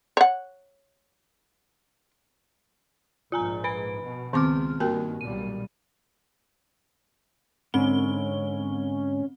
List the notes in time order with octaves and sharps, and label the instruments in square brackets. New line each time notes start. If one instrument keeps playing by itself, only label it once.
[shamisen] C#5 F#5
[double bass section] A#1 G#2 [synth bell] F4 G#5 A#5
[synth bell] B4 B5 D7
[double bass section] B2
[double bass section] C#2 [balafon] D#3 C4 D6 [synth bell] B3 C6 F6
[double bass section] G2 D#3 [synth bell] A#3 [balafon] F#4 A#4 G5
[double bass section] B1 A#2 G3 [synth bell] D#7
[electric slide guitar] G#2 D3 [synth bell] C4 G7 [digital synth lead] C#4